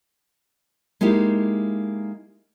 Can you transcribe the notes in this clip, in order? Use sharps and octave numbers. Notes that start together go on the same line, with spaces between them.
G#3 A#3 D#4 E4 G4